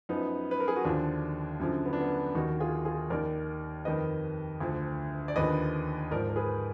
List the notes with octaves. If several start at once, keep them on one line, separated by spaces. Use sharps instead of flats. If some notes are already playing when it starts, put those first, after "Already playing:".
F#2 F3 B3 D#4
B4
A#4
G#4
F#4
D#2 D3 F3 D4 F4
F#2 D3 F3
B3
D4
B3
D#2 D#3 D#4 F#4
F4 G#4
F4 G#4
D#2 D#3 A#4 D5
F2 D#3 B4 D#5
D2 D3 F3
D5
D#2 D3 F3 B4 D#5
G#2 F3 A#4 D5
A#4
G#4 B4